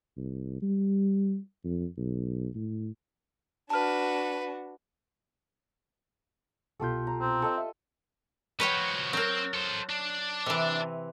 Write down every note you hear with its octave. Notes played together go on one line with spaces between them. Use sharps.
C2
G3
F2
B1
A2
D4 F#4 B4 A5 F6
C2 B2 F4 G4 A4 G6
A#5
C4
A4 D#5 E6
E5
F3 F#4 B4 C#5 G5
F#3 C4 A#4
A4 C5
D4
C3 E3